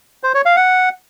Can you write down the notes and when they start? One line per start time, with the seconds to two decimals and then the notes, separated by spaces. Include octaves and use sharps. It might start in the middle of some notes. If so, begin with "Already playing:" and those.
0.23 C5
0.34 C#5
0.45 F5
0.57 F#5